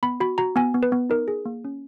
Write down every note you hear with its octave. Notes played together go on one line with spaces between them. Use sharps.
B3 B5
F#4 B5
F#4 A#5
B3 G#5
B3
B4
B3
D#4 A#4
G#4
A#3
C#4